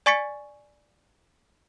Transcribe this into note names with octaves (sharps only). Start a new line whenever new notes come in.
D5 G#5 C#6 A6 B6 C#7